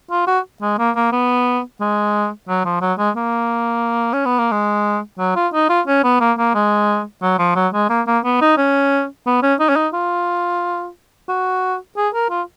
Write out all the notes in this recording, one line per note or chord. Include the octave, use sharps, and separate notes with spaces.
F4
F#4
G#3
A#3
A#3
B3
G#3
F#3
F3
F#3
G#3
A#3
C#4
B3
A#3
G#3
F#3
F4
D#4
F4
C#4
B3
A#3
A#3
G#3
F#3
F3
F#3
G#3
A#3
A#3
B3
D#4
C#4
B3
C#4
D#4
C#4
D#4
F4
F#4
G#4
A#4
F4